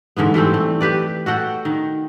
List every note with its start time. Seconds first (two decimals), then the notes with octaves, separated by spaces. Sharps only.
0.17 G#2 D3 E3 B3
0.34 E3 G3 A3 C4
0.54 A3
0.81 G4 B4 D5
1.26 F#4 A4 F#5 G5
1.65 D#3